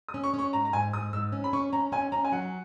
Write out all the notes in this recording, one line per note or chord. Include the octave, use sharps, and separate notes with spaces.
D#6
C#4
C#6
C#4 C#6
G#2 A#5
A#5
G#2 G#5
G#2 D#6
G#2 E6
C#4
B5
C#4 C#6
C#4 A#5
C#4 G#5
C#4 A#5
G#5
F#3 F#5